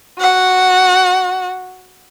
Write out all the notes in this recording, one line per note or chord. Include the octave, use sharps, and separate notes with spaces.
F#4 F#5